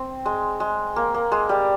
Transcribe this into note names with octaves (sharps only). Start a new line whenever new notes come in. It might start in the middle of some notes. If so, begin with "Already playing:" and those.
Already playing: C4
G#3
G#3
A#3
A#3
G#3
G3